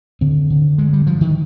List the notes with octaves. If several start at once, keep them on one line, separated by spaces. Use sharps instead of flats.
D3 C4
D3
G2 G#3
G3
G2 F3
D#3